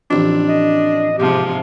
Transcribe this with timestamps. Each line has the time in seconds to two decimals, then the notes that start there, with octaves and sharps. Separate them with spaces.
0.11 A1 F2 D4
0.49 D#5
1.18 G#2 C3 F3 G4